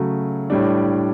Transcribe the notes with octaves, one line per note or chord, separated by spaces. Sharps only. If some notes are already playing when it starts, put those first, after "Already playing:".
Already playing: C#3 F#3 A3
A2 G3 D4